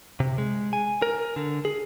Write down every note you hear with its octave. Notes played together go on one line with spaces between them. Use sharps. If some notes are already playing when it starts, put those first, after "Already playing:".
C3
G#3
G#5
A#4
D3
G#4